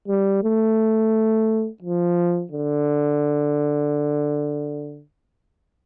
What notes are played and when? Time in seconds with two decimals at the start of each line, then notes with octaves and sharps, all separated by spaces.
0.08 G3
0.43 A3
1.82 F3
2.52 D3